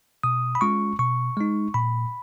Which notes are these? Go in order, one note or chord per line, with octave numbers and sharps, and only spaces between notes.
B2 D#6
B5
G#3 C#4 F4 C#6
B2 C#6
G#3 D#4
A#2 B5